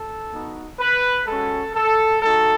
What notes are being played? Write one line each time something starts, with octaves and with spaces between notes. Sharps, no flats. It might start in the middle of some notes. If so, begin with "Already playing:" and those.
Already playing: A4
B3 D#4 F#4
B4
G#3 C#4 F#4 A4
A4
G#3 D#4 F#4 A4